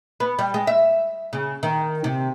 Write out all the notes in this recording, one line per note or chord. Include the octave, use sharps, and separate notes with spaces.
B3
G3
G#3
E5
C#3
D#3
C3